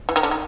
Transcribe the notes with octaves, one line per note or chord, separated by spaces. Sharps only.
E3
D#3
D3
D#3